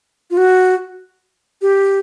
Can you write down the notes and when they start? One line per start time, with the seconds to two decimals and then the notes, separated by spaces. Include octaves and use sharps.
0.31 F4
0.37 F#4
1.62 G4